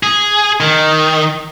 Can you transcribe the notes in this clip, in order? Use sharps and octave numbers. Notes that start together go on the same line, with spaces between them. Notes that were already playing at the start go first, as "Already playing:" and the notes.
G#4
D#3